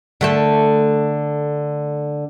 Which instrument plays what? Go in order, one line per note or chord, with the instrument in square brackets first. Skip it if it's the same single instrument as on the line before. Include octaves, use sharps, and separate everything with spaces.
[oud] D3 A3 A4